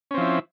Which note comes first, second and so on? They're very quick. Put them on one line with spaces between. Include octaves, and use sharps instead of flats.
C#4 C4 F3 E4